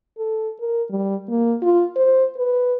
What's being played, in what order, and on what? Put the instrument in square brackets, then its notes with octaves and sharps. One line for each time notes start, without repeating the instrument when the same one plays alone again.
[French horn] A4
A#4
G3
A#3
F4
C5
B4